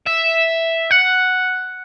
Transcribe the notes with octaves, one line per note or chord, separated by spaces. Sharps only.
E5
F#5